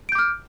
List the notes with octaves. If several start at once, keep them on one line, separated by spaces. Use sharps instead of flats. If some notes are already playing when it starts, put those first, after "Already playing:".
D6 F6 G6 D7